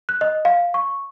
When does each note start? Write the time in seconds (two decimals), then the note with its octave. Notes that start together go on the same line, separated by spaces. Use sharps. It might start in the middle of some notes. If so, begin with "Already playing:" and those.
0.09 F#6
0.21 D#5
0.45 F5
0.74 C#6